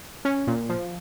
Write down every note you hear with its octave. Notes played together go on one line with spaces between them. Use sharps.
C#4
A#2
F3